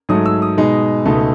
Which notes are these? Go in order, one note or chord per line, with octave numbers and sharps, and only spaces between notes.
G#2 F#3 A3 D#6
E6
D#6
B2 G#3 D#4
C#2 B2 A3 D#4